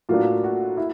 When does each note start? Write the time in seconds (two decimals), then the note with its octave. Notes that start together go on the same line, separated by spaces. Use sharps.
0.09 A2 F#3 A#3 D4 F4
0.44 F#4
0.77 E4